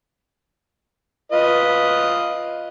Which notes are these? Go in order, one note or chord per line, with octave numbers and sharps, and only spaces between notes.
F4 B4 D#5